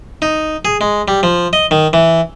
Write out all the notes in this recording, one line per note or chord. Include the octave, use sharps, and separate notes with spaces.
D#4
G#4
G#3
G3
F3
D#5
D#3
E3